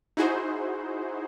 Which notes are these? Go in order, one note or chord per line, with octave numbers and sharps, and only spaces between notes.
D#4 E4 F#4 G#4 C5